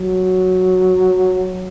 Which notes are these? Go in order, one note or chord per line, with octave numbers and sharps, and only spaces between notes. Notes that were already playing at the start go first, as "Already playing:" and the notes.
Already playing: F#3